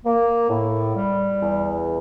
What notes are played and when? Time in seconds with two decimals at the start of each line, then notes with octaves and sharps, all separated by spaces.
0.04 A#3
0.49 A2
0.95 G3
1.41 E2